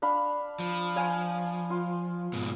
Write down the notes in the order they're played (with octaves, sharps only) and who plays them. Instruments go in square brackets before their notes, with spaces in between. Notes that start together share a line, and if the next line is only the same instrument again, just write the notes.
[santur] D4 F5 B5
[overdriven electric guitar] F3
[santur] F5 G#5
F4
[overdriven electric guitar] G#2 B2